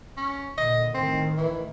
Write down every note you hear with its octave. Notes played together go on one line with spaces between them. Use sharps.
C#4
A#2 D3 D#5
A2 D#3 C4
E3